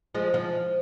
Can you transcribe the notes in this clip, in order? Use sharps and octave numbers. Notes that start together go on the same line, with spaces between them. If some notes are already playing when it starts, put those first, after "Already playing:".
F3 G#3
F3